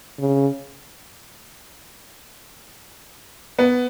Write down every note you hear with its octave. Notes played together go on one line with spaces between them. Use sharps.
C#3
B3